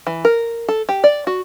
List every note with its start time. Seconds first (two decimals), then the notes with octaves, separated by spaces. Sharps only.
0.07 E3
0.25 A#4
0.68 A4
0.89 G4
1.04 D5
1.27 F#4